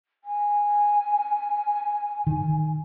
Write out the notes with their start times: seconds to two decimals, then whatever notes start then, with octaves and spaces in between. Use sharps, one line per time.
0.24 G#5
2.27 D#3